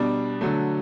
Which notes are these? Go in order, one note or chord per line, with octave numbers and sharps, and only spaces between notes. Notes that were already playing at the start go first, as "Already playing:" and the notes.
Already playing: B2 G3 D4
D3 F#3 A3